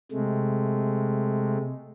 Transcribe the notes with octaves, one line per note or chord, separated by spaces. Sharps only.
C3 G#3 A3